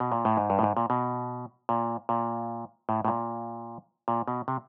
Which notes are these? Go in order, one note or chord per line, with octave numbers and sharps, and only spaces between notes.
B2
A#2
A2
G#2
G2
A2
G#2
A#2
B2
A#2
A#2
A2
A2
A#2
A#2
B2
C3